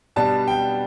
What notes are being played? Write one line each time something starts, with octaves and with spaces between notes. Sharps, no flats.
B2 G3 B3 D4 A5
G5